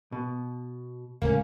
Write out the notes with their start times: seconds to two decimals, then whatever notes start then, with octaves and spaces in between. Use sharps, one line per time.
0.12 B2
1.22 D1 C#2 A3 A#3 C#4